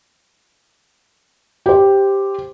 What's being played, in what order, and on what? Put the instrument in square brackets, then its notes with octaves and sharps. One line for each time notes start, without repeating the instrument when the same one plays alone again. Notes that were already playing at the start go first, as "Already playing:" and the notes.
[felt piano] G4 C5